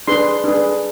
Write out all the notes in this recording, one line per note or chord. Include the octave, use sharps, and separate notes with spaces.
D4 G#4 B4 C6
D4 G#4 B4